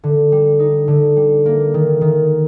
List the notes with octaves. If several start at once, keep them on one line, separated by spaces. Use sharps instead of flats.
D3
G3
D#4
D3
G3
A#3
D#3
D#3